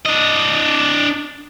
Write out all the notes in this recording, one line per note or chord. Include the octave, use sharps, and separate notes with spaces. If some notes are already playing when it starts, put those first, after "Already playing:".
D4 D#5